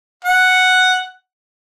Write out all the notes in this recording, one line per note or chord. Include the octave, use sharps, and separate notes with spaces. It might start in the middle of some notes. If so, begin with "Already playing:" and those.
F#5